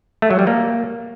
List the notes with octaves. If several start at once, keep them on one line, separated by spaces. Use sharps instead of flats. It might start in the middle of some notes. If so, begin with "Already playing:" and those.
A3
F#3
G3
A#3